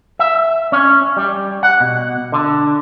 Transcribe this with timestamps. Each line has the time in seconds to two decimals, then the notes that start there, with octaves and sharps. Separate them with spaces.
0.19 E5
0.72 C#4
1.16 G3
1.63 F#5
1.80 B2
2.32 D3